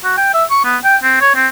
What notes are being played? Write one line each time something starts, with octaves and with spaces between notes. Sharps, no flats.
F#4
G5
E5
C#6
B3
G5
C4
C#5
C4